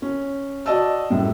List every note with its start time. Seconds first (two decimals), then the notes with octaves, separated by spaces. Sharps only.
0.02 C#4
0.66 F#4 D5 D#5 A5 E6
1.10 F#2 A2 G3